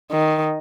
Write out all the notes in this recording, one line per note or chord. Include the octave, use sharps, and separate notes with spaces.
D#3